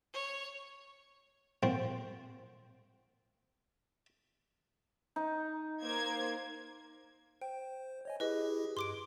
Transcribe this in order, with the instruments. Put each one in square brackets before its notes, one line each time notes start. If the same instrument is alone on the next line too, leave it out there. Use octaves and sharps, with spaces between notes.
[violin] C#5
[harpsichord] C4 F4 A#4 C5 F#5 G5
[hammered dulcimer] D#4
[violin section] A#3 C5 G#6
[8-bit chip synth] C5 [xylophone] G5
[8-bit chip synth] C#5 D#5 G#5
[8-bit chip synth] E4 G4 G#4 [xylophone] B4 D#5
[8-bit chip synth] G2 [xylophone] C6 D6 D7